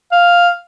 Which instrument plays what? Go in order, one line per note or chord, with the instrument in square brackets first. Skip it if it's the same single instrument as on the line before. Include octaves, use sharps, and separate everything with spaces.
[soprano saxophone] F5